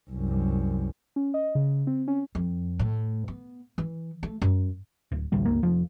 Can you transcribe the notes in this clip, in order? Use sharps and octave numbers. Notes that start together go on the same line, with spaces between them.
C2 F#2
C#4
D#5
C#3
C4
C#4
F2
A2
B3
E3
A3
F#2
D1
A1 D2 G3
G1 C#2 A#3
F1 F3